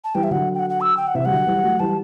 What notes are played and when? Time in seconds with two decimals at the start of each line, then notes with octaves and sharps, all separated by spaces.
0.04 A5
0.15 E3 G3 G5
0.24 E5
0.31 D3 F#3 F#5
0.55 G5
0.59 F#5
0.70 F#5
0.81 E6
0.97 G5
1.07 F#5
1.14 C3 E3 E5
1.25 G3 F#5
1.30 D3 F#3
1.47 E3 G3
1.63 F#3 A3
1.80 E3 G3 A5